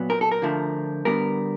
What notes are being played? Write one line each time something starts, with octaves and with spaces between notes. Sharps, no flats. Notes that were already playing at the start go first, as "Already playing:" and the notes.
Already playing: A#2 F#3 B3
A#4
A4
A#4
D3 F3 A3
D3 G3 B3 A#4